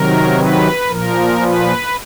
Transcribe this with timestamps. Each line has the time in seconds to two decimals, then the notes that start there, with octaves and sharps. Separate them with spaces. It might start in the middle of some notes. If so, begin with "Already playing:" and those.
Already playing: C3 D#3 F#3 A#4
0.37 B4
0.89 A#2 F3 A#4
1.42 B4